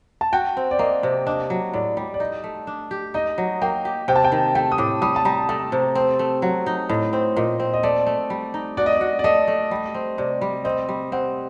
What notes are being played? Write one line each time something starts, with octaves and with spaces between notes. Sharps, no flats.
A5
F#4 G5
C4
D5
A#3 D#5
C3
D4 D#5
F#3
A2 D5
G3 D5
D5
D#4 D#5
A3
D4
G4
D#4 D#5
F#3
A#3 G5
G4
C3 G5
A5
G5
D#3
A3 G5
D#6
A2 D6
G3 D#6
A5
G3 A#5
A3 A5
C3
C4
A3
F#3 F#5
D#4
A2 D#5
C4
A#2 D#5
C4
D#5
A3 D5
A3
G3
D#4
F#4 D5
D#5
F#4 D5
D5
A3 D#5
A3
G3
C4
C3 D5
G3
C4 D#5
G3
C4 F#5